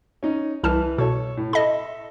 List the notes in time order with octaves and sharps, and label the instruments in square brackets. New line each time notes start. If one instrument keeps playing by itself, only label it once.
[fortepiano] C#4 D#4
[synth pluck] C2 A5 [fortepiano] E3 B4 F6
[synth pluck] B2 [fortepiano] A4 C#5
[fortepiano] A2
[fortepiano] A4 E5 [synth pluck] D#5 B5